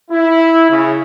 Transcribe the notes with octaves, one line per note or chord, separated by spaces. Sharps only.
E4
C#3